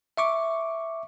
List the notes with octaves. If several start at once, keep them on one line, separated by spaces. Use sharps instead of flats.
E5 C#6 D6